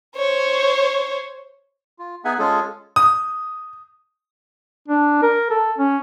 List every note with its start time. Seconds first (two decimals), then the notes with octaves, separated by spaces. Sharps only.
0.16 C5 C#5
1.99 F4
2.25 B3 D#4 G#4 E5 F#5 G#5
2.39 G#3 C#4 F4 G#4 A4
2.96 D#6
4.88 D4
5.22 A#4
5.51 A4
5.78 C#4